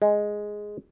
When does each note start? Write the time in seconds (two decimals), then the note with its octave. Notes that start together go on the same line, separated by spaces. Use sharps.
0.02 G#3